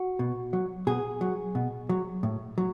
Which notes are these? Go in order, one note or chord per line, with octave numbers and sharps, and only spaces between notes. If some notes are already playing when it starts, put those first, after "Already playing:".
Already playing: F#4
B2
F#3
B2 G#4
F#3
B2
F#3
A2
F#3